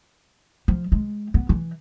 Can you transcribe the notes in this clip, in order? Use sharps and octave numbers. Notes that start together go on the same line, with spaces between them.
F3
G#3
B3
E3